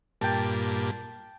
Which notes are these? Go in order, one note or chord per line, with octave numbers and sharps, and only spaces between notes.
G2 A#2 G5 A5